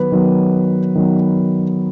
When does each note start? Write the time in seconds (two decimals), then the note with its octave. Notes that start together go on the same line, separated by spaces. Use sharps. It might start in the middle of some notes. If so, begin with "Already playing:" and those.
Already playing: D#3 F#3 B3 B4
0.12 D#3 F#3 B3
0.95 D#3 F#3 B3